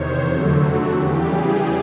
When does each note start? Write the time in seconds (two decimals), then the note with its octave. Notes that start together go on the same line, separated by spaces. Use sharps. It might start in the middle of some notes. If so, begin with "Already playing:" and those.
Already playing: E2 C3 D#3 C5 C#5
0.26 F2 D3 F#3 A3
0.58 F#4
0.91 E2 C#3 E3 G3 G4
1.25 G#4